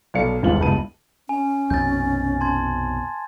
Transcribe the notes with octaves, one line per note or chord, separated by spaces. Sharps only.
B1 A4 D5 F5 C#7
G1 D#2 G#2 E3 F4 F#7
F#1 C#2 G2 B3 A5 D#7
C#4 G#5
B1 F#2 C3 G6 A6
A5 C6 G#6